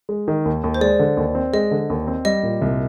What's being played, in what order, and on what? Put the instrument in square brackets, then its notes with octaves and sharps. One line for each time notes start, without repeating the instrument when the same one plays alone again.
[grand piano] G#3
D#3
D#2
D#2
[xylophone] C5
[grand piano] G#3 [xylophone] D5
[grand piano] D3
D#2
C4
[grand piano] G#3 [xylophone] D#5
[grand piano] D3
D#2
C4
[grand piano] G3 [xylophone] D#5
[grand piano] A#2
C2